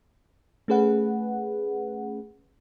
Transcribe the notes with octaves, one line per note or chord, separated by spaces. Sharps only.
A3 C#4 G#4 B4 F#5